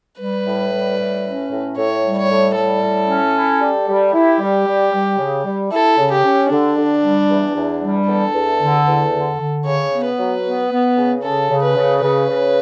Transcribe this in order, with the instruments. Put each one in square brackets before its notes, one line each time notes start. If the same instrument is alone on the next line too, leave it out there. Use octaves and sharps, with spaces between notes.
[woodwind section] G3 [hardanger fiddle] B4
[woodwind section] A2
G3
A2
C#4
A2
[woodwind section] A2 [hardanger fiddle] C#5
[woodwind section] G3
[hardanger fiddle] C#5
[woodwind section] A2
[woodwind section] G3 [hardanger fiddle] A4
[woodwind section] A2
C#4
E4
G3
G3
[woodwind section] E4 [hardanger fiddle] G4
[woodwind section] G3
G3
G3
C#3
G3
[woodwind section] E4 [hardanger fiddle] A4
[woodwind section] C#3
[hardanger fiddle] G4
[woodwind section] C#4
[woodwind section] D3 [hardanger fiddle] D4
[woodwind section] D3
G3
E2
E2
G3
[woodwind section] E2 [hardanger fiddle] A4
[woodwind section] E2
D3
E2
D3
D3
[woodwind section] C#3 [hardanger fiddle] C#5
[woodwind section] B3
[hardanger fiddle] B4
[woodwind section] F#3
B3
B3
C#3
[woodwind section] C#3 [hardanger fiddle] A4
[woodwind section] C#3
[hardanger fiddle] B4
[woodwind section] C#3
[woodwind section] C#3 [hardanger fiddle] B4
[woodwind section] C#3